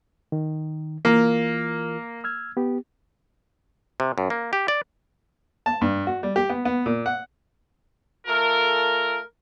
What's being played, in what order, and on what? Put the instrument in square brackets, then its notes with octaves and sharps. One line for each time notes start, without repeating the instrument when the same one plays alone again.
[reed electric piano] D#3
[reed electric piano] E3 F4 A#4 [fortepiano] A#3
[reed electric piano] E6 F6 G#6
B3 G4
[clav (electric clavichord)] C3
F#2
A#3
G4
D5
[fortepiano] A5
G2
F#4
G3
G4
B3
B3
A#2
F#5
[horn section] A3 F4 A4 A#4